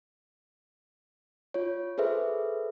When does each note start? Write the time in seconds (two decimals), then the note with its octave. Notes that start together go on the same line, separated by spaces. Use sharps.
1.54 F4 C#5
1.98 G#4 A4 B4 C5 E5